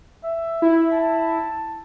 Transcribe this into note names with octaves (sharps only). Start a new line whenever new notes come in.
E5
E4
A5